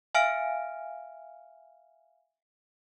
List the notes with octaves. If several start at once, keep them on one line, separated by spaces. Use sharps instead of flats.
E5 F5 G#5 F6 D7